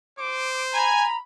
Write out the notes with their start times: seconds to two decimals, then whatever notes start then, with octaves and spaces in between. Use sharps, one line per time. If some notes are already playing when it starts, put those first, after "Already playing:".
0.19 C5 D6
0.73 G#5 A#5 B5